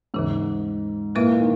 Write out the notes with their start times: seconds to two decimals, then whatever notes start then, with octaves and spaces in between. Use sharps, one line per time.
0.14 D#2 G#2 C#3 E3
1.15 A#2 F#3 A#3 E4 B4 E5
1.41 D#3